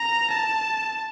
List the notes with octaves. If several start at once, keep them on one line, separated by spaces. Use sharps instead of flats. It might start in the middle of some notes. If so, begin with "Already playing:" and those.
Already playing: A#5
A5